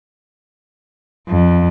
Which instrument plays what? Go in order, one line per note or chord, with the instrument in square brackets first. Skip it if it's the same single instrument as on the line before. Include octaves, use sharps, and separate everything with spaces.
[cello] F2